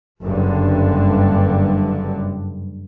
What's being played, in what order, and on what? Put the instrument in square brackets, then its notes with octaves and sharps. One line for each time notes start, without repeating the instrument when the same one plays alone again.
[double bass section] F#1 G2 D3